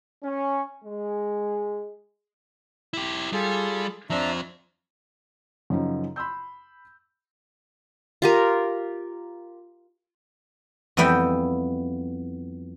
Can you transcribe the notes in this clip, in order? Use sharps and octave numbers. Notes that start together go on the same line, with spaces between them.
C#4
G#3
E4 G4
G3 F4 G#4 A4
F3 C4 D4 E5 A#5
F#2 C#3 F3 C#4 D#4
B5 C6 E6 G6
F4 G4 A#4
F2 E3 G3 B3 E5 G5